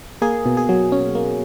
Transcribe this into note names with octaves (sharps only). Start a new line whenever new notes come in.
A#3 G#4
B2
G#4
F#3
C#4
A#3